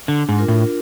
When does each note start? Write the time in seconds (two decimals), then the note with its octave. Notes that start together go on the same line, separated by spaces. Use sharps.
0.08 D3 D4
0.29 G#2
0.38 F4 A#4
0.48 A2